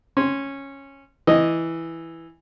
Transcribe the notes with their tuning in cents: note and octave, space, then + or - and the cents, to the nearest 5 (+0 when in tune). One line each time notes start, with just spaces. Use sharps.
C#4 -10 C6 +0
E3 +0 D#5 +0